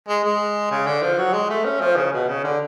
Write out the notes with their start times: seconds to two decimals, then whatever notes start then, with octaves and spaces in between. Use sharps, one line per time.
0.08 G#3
0.24 G#3
0.71 C#3
0.86 D3
1.02 F3
1.18 F#3
1.34 G#3
1.50 A3
1.64 C#4
1.81 F3
1.96 C#3
2.13 B2
2.28 C#3
2.44 D3